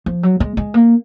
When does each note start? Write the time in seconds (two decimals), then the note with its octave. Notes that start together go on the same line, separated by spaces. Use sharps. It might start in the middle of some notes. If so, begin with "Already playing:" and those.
0.06 F3
0.23 F#3
0.40 G#3
0.57 G#3
0.74 A#3